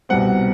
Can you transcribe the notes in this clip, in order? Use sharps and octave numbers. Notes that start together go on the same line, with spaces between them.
C2 B2 G3 C4 F#5